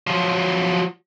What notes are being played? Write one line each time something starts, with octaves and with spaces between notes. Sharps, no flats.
F3 F#3